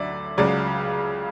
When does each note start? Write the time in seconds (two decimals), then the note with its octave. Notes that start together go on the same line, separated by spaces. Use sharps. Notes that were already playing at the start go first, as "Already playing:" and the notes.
Already playing: D2 D3 F#3 D5 E5
0.38 C#2 C#3 F#3 D5